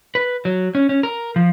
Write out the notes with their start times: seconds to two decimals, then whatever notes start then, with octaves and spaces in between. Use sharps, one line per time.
0.15 B4
0.45 F#3
0.75 C#4
0.89 C#4
1.03 A#4
1.36 F3